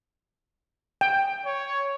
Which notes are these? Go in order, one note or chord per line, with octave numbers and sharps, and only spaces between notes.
G5
C#5